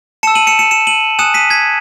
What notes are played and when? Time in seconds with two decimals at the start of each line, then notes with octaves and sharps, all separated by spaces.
0.23 A5 E6 C#7 E7
0.35 D#7 F#7
0.47 C#7 E7
0.59 C#7 E7
0.71 C#7 E7
0.87 D#7 F#7
1.19 G#5 D#6 F#6 C#7 E7
1.34 B6 D#7
1.50 G#6 B6